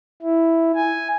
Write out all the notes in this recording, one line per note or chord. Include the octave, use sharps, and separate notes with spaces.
E4
G#5